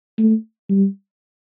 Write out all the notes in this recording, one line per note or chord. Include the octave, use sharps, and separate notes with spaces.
A3
G3